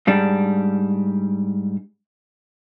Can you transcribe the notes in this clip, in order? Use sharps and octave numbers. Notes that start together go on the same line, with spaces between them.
G#2 G3 D4